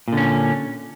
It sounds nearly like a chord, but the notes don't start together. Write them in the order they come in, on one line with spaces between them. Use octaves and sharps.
A#2 D3 C#4